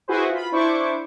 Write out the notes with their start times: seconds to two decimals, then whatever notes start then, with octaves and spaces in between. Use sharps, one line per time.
0.08 E4 F#4 G#4 B4 C5
0.30 F4 B5
0.52 D4 E4 C5 C#6 D6